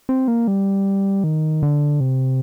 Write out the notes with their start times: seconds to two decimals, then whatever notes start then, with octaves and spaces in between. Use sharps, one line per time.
0.09 C4
0.28 A#3
0.48 G3
1.24 D#3
1.63 D3
2.00 C3